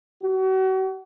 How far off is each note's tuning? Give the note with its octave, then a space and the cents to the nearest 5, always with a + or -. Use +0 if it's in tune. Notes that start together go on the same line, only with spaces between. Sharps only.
F#4 +35